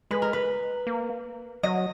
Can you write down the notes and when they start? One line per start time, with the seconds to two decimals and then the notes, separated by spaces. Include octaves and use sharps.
0.11 G#3 B4
0.22 A#4
0.33 B4
0.87 A#3
1.63 F#3 D#5